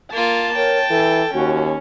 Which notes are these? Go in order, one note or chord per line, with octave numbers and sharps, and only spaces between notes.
A#3 F4 A5
A#4 C#5 G5
E3 A4
D#2 C#4 F#4